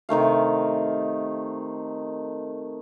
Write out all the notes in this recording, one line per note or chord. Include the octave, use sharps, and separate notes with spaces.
C3 D#3 A3 F5